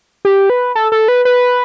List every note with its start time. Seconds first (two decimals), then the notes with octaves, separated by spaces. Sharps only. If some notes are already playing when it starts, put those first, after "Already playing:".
0.25 G4
0.50 B4
0.75 A4
0.92 A4
1.08 B4
1.25 B4